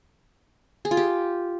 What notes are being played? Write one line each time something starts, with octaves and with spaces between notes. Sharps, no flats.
G#4
F4
G4